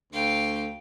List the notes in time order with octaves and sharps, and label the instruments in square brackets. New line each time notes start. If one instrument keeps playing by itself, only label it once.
[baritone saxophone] D2 [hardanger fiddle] F5 G5